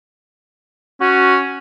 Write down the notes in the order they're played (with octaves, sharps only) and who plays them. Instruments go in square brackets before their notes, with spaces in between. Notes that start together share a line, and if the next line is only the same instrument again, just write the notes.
[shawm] C#4 [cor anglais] F#4